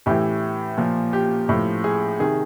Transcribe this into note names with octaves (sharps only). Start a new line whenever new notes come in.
A2 E3 G4
A#2 F3
G4
A2 F3
G#4
C3 D#3 G#4